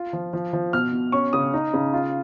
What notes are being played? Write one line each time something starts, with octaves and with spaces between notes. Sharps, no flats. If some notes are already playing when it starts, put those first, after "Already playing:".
Already playing: F4
F3
F3
F3
B2 F6
B2
C#4 C#6
C#3 D#6
D#4
C#3
F4